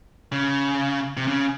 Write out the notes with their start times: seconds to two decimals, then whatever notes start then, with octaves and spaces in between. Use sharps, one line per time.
0.32 C#3
1.17 C3
1.28 C#3